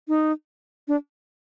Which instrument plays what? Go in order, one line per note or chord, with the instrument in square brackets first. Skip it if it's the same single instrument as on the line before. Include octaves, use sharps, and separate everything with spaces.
[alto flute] D#4
D4